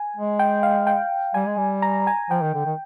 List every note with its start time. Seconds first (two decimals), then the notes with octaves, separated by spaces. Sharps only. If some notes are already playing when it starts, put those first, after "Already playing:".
Already playing: G#5
0.16 G#3
0.39 G5
0.63 F5
0.87 G5
1.34 G3 G#5
1.46 G#3
1.57 G3
1.82 A#5
2.07 G#5
2.30 F3 G5
2.42 D#3
2.54 D3
2.66 D#3